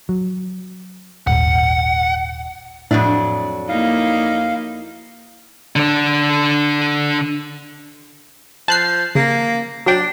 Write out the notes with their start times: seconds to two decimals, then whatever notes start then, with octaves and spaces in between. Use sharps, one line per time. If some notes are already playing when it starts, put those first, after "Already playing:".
0.09 F#3
1.27 D#1 G#1 F#5
2.91 F2 A2 F#3 D4 E5 D#7
3.69 A#3 D#4 E4 F5
5.76 D3 D4
8.68 F3 A5 F#6 C7
9.15 C#3 A#3
9.86 F#3 D4 G5